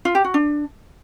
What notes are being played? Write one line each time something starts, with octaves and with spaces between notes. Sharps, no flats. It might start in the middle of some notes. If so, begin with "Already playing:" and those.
F4
G4
F#4
D4